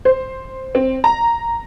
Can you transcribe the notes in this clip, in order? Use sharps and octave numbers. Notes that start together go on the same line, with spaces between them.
C5
C4
A#5